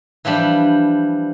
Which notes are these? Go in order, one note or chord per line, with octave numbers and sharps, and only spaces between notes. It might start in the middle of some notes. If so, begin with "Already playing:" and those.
E3 F3 G3 D4 B4